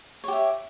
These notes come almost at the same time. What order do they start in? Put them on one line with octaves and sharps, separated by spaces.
C#5 G4 E5